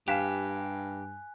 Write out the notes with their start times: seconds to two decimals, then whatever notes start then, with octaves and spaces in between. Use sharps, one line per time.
0.08 G2 G4 F5 G#5 F#6 B6 E7